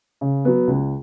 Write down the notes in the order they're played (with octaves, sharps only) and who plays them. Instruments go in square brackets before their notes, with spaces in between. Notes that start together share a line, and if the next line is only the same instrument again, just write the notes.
[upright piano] C#3
F#3 B3
C#2